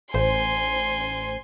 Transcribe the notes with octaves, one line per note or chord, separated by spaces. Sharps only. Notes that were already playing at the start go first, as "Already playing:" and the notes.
A1 C5 G#5 C6